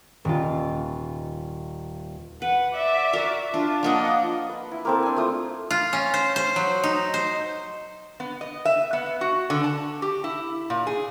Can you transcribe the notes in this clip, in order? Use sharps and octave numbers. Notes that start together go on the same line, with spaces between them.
D#1 F4
B4 F#5
D5 E5
F#4 A#4
D4 F4
F3 A#3 D4 D#5 F#5
B4
E4
A#3 C4 A4
D4 G#5
A3 F4 D#6
F4
C#4
C5
C5
F#3
D#4
C5
B3
D#5
E5
B3
F#4
D3
A5
G4
E4
A#2
G#4